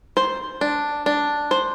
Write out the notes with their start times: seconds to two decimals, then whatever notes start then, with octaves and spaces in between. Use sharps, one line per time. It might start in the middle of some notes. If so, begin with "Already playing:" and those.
0.17 C5
0.61 D4
1.06 D4
1.51 C5